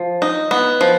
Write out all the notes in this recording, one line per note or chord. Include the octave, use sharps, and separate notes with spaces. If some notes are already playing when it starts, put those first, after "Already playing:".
Already playing: F3
D#4
B3
F3